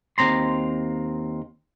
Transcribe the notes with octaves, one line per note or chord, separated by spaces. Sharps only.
D#2 C4 A#5 C6